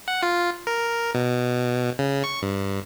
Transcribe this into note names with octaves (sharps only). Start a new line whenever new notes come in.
F#5
F4
A#4
B2
C#3
C#6
G2